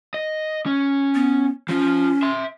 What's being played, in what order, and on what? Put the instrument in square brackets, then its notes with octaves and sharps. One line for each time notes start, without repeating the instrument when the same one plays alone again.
[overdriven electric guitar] D#5
C#4
[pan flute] B3
[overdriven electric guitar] F3 F4 [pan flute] C#4
[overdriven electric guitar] E5 C6